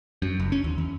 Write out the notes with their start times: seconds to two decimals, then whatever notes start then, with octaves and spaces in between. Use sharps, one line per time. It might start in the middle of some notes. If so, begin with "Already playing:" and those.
0.22 F#2
0.39 F#1
0.52 C#4
0.64 D#2
0.78 E2